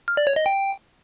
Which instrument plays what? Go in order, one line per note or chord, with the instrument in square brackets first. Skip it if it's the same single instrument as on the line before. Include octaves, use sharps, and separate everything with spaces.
[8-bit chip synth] F6
D5
C#5
D#5
G5